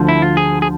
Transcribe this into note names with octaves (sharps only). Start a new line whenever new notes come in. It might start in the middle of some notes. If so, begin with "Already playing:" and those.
Already playing: D2 D3 F3
E4
F4
G#4
G#4